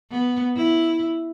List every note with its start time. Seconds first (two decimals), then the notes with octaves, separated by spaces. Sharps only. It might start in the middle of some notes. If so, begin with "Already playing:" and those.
0.11 B3
0.56 E4